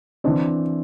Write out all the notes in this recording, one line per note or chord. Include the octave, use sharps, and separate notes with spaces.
E3 C4 D4